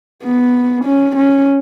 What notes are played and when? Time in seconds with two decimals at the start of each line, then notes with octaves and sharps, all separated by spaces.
0.23 B3
0.85 C#4
1.16 C#4